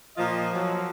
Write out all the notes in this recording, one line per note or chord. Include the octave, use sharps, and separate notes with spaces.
A#2 F3 F4 D#5
F3 F#3